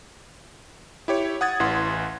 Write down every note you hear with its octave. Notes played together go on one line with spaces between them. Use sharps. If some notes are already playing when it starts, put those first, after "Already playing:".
E4 G4 C#5
F#5 D#6 G#6 A6
A1 E3 F#5 C6